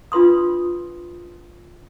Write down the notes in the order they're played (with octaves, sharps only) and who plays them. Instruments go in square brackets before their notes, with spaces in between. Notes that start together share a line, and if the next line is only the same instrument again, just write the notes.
[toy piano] D4 F4 B4 C6 D#6